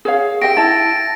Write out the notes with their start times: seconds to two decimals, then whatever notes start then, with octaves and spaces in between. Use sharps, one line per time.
0.05 G#4 C#5 F5
0.42 G4 E5 G5 A#6 D7
0.57 E4 A5 A6